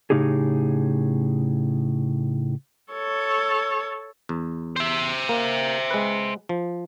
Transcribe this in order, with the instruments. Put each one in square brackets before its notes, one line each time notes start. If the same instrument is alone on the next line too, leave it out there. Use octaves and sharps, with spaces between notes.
[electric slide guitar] A2 C#3 G#3 D#4 G4 G#4
[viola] A4 C#5
[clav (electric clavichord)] E2
[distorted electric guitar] C5 E5
[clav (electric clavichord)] A#3
G#3 B4
F3